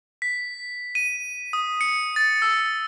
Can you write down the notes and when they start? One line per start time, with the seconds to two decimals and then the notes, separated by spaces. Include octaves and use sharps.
0.22 B6
0.95 D#7
1.53 D#6
1.81 C#7
2.16 A6
2.42 E6